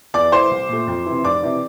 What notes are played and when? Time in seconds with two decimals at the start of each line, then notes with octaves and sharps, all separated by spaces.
0.14 E2 D5 D6
0.32 E3 A3 C5 C6
0.51 C2
0.68 A#2 A3
0.87 F2
1.06 C3 E3
1.24 F1 D5 D6
1.43 C3 E3